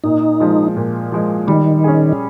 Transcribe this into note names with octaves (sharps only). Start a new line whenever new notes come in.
A#2 D#4
F3 G#3
A#2
F3 G#3
D#3 G3
C#4 G#4